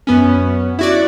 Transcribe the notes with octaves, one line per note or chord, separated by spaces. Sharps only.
F#2 B3 C#4
E4 F#4 D5